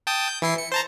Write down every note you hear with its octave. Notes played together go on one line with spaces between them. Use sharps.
G5 A5 D#6
G6
E3 E4 C7
C#7
C5 A5 A#5